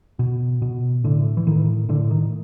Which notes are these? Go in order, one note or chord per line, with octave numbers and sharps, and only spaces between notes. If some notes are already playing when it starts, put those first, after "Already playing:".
B2
B2
A2 D3
E3
A2 D#3
A2 D3
D#3